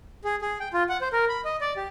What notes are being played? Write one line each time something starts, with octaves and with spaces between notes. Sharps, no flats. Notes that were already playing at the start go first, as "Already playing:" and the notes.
G#4
G#4
G5
F4
F#5
C5
A#4
B5
D#5
D5
G4